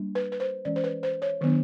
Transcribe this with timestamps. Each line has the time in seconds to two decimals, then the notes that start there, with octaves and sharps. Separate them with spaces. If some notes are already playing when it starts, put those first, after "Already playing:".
Already playing: G3 A#3 D4
0.15 B4
0.32 B4
0.40 C5
0.65 E3 G#3 C#4 D5
0.76 C5
0.84 B4
1.03 C5
1.22 C#5
1.41 D#3 F#3 B3 D4